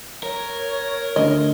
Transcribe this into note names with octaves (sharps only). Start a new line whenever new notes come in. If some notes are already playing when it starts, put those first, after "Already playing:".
A#4 C#5
D2 D#5